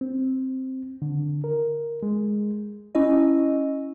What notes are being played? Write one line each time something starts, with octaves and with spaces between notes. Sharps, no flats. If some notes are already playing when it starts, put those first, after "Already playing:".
C4
D3
A#4
G#3
C#4 E4 D#5